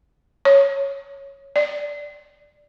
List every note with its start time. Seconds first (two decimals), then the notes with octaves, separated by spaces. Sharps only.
0.45 C#5
1.56 D5